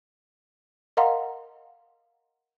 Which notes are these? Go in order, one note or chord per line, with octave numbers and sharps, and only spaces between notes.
A#4 D#5 F5 F#5 A#5 C6